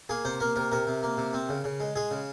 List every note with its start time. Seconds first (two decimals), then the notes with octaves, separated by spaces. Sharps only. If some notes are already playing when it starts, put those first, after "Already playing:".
0.09 A#3 G#4
0.25 C3 C5
0.40 A#3 A#4
0.56 C3 A#4
0.72 C3 A#4
0.87 C3
1.03 A#3
1.17 C3
1.33 C4
1.49 C#3
1.64 C#3
1.80 G#3
1.95 G#3 G#4
2.11 C#3